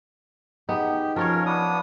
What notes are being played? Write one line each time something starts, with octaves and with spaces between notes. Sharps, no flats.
B3 D#4 G4 G#4
F3 C#4 F4 A#4 C#5
B3 D4 D#6